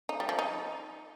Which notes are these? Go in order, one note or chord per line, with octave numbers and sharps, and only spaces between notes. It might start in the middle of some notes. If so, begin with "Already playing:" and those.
D#4
G3
F3
D#4